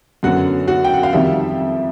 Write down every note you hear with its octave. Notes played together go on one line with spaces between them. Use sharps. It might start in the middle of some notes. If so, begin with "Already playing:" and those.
F#2 D3 F#3 B3 F#4 F#5
F#4 F#5
G5
F#5
F5
F2 C3 D#3 G3 E5